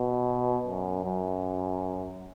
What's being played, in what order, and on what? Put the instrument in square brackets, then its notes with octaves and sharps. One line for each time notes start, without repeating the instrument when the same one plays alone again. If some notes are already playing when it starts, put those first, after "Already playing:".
Already playing: [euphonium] B2
F#2
F#2